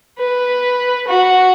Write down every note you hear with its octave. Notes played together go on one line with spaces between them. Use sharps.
B4
F#4